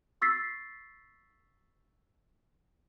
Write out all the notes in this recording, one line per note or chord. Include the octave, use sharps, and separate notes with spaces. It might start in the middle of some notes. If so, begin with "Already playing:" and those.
C#6 E6 A6 B6 C7